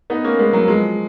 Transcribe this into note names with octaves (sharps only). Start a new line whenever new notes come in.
B3 D#4
A#3 C#4
G#3 B3
F#3 A#3
F3 G#3